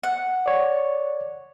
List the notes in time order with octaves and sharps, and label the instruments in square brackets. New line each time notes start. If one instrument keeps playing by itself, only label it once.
[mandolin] F#5
[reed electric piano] C#5 D5